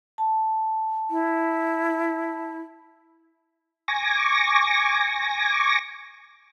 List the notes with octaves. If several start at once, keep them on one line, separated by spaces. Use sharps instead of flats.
A5
E4
G#5 C#6 D6 A#6